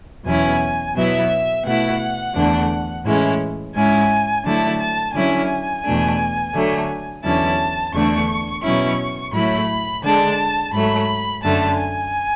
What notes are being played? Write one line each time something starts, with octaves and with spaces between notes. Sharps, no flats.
E2 B2 F#3 C#4 E4 G#5
B2 F#3 B3 E4 E5
B2 A3 E4 F#5
E2 D3 A3 D4
A2 E3 G#3 C#4 E4
G#2 G#3 C#4 E4 G#5
D3 F#3 A3 E4 A5
A5
D3 F#3 C#4 E4 G#5
E2 B2 A3 D4
D3 F#3 A3
E2 D3 F#3 C#4 E4 A5
E2 D3 A3 D4 C#6
B2 F#3 C#4 E4 C#6
A2 F#3 A3 E4 B5
D3 G#3 D4 A5
G#2 F#3 A3 B5
F#2 D3 A3 A5
G#5